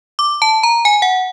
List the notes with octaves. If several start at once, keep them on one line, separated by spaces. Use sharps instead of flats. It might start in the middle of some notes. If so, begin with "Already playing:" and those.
D6
A5
A#5
G#5
F#5